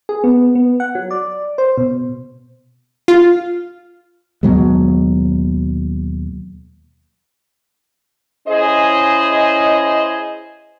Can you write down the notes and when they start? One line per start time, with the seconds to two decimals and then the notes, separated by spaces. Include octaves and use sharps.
0.09 G#4
0.24 B3
0.55 B3
0.80 F#5
0.95 F#3
1.11 D5
1.58 C5
1.78 B2
3.08 F4
4.43 D#2 B2 F#3 G#3
8.48 C#4 E4 G#4 C5 D#5